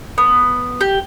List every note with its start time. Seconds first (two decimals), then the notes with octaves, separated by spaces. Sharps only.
0.18 B3
0.81 G4